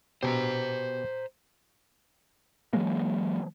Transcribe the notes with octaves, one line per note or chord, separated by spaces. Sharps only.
B2 G4 C5 A5 A#5
E3 F#3 G#3 A#3